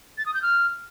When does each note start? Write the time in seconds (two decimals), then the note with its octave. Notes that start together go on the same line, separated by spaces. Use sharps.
0.18 A6
0.26 D#6
0.34 G6
0.42 F6